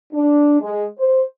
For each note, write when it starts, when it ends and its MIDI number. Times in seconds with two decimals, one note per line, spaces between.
0.12 0.58 62
0.60 0.84 56
0.97 1.22 72